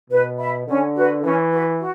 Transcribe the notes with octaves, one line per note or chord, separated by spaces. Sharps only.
B2 B4
E5 B5
D3 C#4
F#4 B4
E3 C#4
F#4 B4
F#4